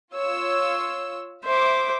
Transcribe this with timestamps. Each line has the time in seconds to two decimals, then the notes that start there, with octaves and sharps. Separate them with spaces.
0.12 F4 C#5 E6
1.45 C5 E5 D6